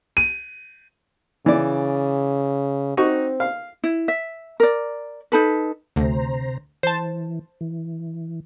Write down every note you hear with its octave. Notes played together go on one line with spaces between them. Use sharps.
D#7
C#3 E3 D5
C4 D#4 F#4 C#6
F5
E4
E5
A#4 D5
D#4 A4 B4
D2 C3 C5 A#5
E3 C5 A5
E3